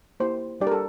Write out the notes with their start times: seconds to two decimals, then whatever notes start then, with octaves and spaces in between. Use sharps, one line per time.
0.20 A#3 E4 G4 C5
0.60 G3 D4 G4 D5
0.67 A#4
0.72 A4